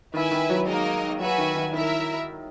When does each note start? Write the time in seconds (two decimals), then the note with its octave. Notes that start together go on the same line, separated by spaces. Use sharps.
0.14 D#3 E4 B4 E5 G#5
0.31 D#3
0.50 F#3
0.67 G#3 A#3 D#4 A#4 D#5
1.20 F#3 F#4 B4 E5 G#5
1.38 D#3
1.55 D#3
1.73 D#3 E4 A#4 E5